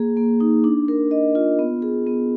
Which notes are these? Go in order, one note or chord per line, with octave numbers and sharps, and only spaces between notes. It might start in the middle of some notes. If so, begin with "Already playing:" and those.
Already playing: A#3 G#4
A#3
D#4
D4
A#4
D#5
F4
B3
G#4
B3